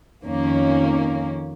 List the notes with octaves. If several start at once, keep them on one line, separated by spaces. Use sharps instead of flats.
F2 D#3 A#3 C#4